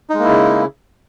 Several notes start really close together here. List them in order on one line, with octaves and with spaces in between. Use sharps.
D#4 G#3 A#3 E4 C#3